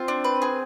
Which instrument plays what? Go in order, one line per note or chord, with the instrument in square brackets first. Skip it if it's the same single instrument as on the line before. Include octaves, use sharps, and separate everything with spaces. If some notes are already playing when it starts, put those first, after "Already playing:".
Already playing: [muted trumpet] C4 [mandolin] F4
[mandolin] D4
B4
G#4